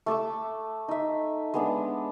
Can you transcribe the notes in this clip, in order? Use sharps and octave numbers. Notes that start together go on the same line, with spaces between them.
A3 A5 D6 E6
D#4 E5
G#3 B3 D4